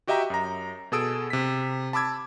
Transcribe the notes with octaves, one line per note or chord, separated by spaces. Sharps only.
F#4 G4 D#5 E5 G5 A#5
F#2 A#5
B2 G#4 A4 D#6 E6 D7
C3 B6
A5 B5 D6 E6 G#6